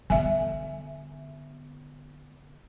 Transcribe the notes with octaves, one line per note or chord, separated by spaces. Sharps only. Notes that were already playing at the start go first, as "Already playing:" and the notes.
D3 B3 E5 G#5